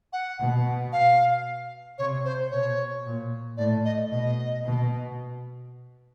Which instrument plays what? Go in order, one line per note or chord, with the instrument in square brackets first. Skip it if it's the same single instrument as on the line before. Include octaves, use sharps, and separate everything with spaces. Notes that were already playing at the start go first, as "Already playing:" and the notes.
[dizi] F#5
[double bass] B2
[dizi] F5
[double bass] C3 [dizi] C#5
[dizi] C5
[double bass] B2 [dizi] C#5
[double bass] A#2
[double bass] A2 [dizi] D5
[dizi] D#5
[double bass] B2 [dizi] D#5
[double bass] B2